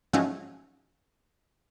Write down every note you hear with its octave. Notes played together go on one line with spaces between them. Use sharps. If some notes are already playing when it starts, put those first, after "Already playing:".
G#2 F3 F#3 G#3 A3 C#4